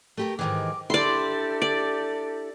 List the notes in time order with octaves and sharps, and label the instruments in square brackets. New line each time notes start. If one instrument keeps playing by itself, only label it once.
[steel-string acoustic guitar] A3 G4 A#4
[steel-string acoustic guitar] G#2 D#3 E3 [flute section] D6
[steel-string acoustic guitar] D4 E4 [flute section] G4 A4 [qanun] D5 C6
[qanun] D5